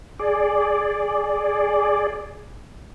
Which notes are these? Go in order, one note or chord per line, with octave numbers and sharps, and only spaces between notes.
G#4 D5